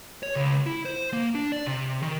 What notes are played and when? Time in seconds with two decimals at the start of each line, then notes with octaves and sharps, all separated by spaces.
0.23 C#5
0.36 C#2
0.66 E4
0.85 C5
1.13 A#3
1.35 D4
1.52 D5
1.66 C3
2.03 D#3